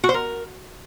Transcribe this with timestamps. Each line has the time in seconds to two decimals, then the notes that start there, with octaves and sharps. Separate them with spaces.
0.04 F#4
0.09 C5
0.14 A#4